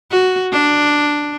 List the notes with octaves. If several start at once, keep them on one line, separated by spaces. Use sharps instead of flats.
F#4
D4